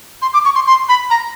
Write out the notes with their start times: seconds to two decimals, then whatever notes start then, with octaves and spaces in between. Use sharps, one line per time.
0.22 C6
0.34 D6
0.45 C#6
0.55 C6
0.67 C6
0.89 B5
1.10 A#5